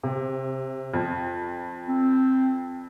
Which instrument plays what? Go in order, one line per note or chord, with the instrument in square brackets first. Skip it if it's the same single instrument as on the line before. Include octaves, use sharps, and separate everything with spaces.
[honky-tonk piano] C3
F2
[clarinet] C4